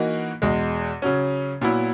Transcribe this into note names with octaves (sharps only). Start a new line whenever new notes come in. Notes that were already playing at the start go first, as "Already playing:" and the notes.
Already playing: E3 A#3 D#4 F#4
E2 B2 G#3
C#3 F#3 C#4
A#2 F#3 B3 E4